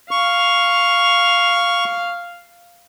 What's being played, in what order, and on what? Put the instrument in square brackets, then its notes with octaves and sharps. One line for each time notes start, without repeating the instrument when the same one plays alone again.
[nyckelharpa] F5 [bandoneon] C#6